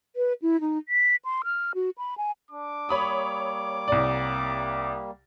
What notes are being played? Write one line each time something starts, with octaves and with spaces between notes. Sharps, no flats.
B4
E4
D#4
B6
C6
F6
F#4
B5
G#5
D4 D6
G3 A#3 C#5 B5 D#6
C2 D5